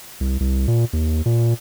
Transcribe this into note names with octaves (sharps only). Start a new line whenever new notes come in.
C2
C2
A#2
D#2
A#2